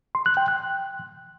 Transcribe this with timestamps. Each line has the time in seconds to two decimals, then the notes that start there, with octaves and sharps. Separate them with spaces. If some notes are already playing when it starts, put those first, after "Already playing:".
0.15 C6
0.26 F#6
0.37 G5
0.48 F#6